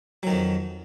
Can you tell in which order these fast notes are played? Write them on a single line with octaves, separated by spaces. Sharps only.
F#3 D#3 F2